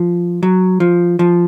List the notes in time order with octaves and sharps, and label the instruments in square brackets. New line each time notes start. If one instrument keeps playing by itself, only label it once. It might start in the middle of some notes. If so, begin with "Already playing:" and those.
Already playing: [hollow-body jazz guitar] F3
F#3
F3
F3